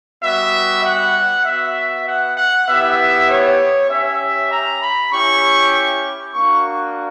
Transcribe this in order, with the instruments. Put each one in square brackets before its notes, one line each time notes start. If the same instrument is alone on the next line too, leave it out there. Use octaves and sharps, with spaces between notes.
[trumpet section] G3 B3 F#4 E5
F#5
B3 F#4 E5
F#5
F#5
B3 E4 G4 E5
C#5
C#4 G4 E5
A#5
B5
C#4 E4 G4 C#6
A#3 D4 F#4 C#6